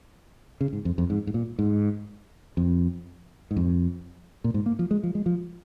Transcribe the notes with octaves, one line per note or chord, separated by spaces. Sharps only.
C#3
G#2
F2
F2
G#2
G#2
A#2
G#2
F2
G#2
F2
A#2
G#2
A#3
F3
G#3
F3
G#3
F3